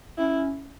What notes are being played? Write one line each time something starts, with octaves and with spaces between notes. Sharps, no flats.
C#4 E4